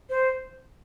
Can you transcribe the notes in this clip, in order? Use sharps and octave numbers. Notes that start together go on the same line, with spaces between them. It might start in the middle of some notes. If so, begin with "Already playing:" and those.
C5